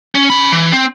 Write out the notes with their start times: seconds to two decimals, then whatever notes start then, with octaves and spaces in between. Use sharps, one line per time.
0.15 C#4
0.30 C#4 B5
0.52 E3
0.72 C4